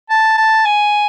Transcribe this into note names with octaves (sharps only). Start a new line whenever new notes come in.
A5
A5
G#5